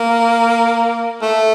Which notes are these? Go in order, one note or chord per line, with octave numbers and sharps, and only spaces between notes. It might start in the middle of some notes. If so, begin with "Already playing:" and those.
Already playing: A#3
A3